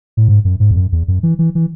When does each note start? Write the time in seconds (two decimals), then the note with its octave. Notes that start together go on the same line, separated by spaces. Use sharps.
0.17 A2
0.28 G#2
0.45 F#2
0.60 G#2
0.71 E2
0.76 F#2
0.92 E2
1.08 F#2
1.23 E3
1.39 E3
1.55 E3